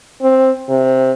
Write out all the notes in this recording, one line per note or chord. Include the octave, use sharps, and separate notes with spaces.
C4
C3